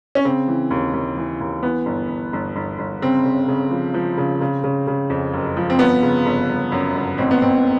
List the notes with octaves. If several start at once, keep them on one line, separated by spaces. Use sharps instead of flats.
C#4
C#3 C4
E3
D#2
D#2
E3
D#2
E3 B3
G1
G1
G1
G1
G1
C#3 C4
C#3
C#3
F3
F3
C#3
C#3
C#3
C#3
F2
F#1
F3
C4
G1 B3
C#3
G1
G1
F#2
G1
A1 C4
B3
A1 C4